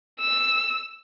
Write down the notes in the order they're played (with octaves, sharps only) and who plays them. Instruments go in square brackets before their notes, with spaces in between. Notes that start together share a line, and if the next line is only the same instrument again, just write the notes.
[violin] E6